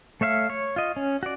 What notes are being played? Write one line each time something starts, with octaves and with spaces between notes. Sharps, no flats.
A3 C#5 E5 F5
C#5
F4 D#5
C#4
F#4 D5